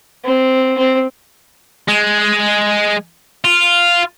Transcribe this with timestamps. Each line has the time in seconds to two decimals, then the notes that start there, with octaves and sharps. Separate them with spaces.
0.24 C4
0.77 C4
1.88 G#3
3.45 F4